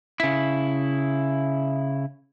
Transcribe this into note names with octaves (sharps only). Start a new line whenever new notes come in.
C#3 E4